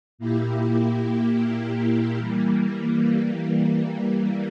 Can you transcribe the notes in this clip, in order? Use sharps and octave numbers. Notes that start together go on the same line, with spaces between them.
A#2 A#3 E4 G4
E3 G3 A#3